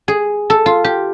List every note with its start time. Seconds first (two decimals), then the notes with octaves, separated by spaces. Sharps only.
0.08 G#4
0.50 A4
0.66 F4
0.84 G4